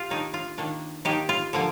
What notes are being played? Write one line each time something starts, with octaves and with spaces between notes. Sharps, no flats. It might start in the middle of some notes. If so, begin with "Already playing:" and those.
Already playing: F4 G4
D#3 A#3 D4 D#4
F4
D#3 A#3 D4
D#3 A#3 D4 D#4 G4
F4
D3 F3 A#3